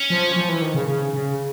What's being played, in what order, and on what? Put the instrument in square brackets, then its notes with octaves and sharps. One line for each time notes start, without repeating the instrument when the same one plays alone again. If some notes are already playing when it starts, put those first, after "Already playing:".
Already playing: [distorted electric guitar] C#4
[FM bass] F3
F3
E3
D#3
C#3
C#3
C#3